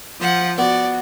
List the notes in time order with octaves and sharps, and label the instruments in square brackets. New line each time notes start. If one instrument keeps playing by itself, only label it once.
[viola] F3 [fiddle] F#5
[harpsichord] B3 [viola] F#4 [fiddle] D5